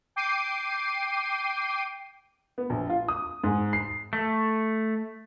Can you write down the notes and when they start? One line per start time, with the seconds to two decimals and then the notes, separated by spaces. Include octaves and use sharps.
0.16 G5 D6 C7 D#7
2.58 B3
2.70 A#1
2.90 F4
3.08 D#6
3.44 G#2
3.73 C7
4.13 A3